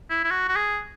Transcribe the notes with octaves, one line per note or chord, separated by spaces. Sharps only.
E4
E4
F#4
F#4
G#4